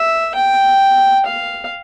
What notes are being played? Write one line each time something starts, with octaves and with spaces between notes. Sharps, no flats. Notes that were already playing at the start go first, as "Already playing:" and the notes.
Already playing: E5
G5
F5